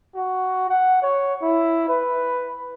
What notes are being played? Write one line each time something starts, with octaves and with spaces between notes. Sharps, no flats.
F#4
F#5
C#5
E4
B4